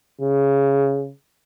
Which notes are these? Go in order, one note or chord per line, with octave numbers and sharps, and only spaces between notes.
C#3